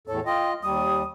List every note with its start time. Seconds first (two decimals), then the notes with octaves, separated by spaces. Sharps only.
0.07 E2 A2 A4 C#5
0.26 F4 D#5 G5
0.63 D#2 G3 D#6